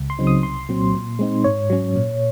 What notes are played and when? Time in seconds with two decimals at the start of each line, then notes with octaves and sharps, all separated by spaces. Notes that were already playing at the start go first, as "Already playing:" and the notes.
Already playing: C#2
0.10 C6
0.19 C#3 F#3 C4 D#4
0.27 D#6
0.43 C2 C6
0.69 A#2 F#3 C4
0.95 A#2
1.19 G#3 C4 D#4
1.44 G#2 C#5
1.70 F#3 C#4
1.96 A#2